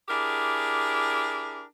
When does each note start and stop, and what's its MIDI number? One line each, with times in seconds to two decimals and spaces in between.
0.08 1.61 62
0.08 1.61 64
0.08 1.61 67
0.08 1.61 68
0.08 1.61 70